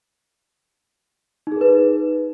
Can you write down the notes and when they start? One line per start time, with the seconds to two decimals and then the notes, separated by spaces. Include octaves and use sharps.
1.47 D#4
1.52 G#4
1.56 A#4
1.61 B4